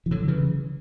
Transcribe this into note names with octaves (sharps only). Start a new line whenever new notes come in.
E3
D3 F#3
C#3 E3